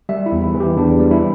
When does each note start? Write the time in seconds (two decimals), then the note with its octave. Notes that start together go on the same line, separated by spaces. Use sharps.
0.09 G3 E5
0.26 E4
0.32 E2
0.44 E4
0.54 E3
0.60 G4
0.76 E2 D4
1.00 G3
1.11 E4